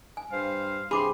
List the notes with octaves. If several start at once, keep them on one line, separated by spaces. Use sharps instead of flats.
G#5
G2 C5 F5
G2 C3 G4 G#4 B5 C6 D6